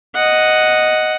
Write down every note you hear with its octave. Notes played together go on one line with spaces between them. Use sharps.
D#5 F#5